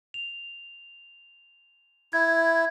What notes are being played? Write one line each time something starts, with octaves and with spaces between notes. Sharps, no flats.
F7
E4 G#6